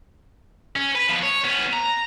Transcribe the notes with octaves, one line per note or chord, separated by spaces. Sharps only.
C#4
B4
F3 B3
C#5
B3 C#4
A#5